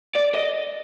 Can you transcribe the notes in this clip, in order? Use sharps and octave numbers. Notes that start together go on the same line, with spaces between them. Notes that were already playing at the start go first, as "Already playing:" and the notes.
D5
D#5